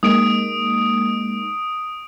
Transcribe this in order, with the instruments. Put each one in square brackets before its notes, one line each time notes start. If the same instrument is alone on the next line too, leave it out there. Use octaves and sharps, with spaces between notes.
[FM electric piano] G#3 A#3 D#4 [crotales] D#6 D7